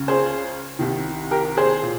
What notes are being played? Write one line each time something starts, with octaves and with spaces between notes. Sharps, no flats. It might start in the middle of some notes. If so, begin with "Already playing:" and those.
Already playing: C#2 C#3
G#4 C5
C2 C3 D#3
G4 A#4
G#4 C5
A#2